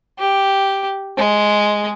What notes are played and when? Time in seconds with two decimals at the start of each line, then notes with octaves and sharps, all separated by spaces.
0.19 G4
1.18 G#3